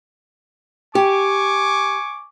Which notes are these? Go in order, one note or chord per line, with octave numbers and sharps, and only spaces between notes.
G4 G#5 C#6 D6